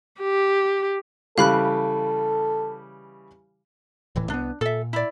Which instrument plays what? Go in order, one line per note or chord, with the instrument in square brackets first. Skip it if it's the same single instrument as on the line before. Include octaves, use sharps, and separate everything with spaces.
[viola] G4
[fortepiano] C#3 E3 G3 [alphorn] A4 [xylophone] F5 B5 F#6
[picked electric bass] D#1 A2 E3
[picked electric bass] C2 A3 B3 [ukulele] D4
[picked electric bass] A#2 [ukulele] A4 E5
[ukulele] E4 D5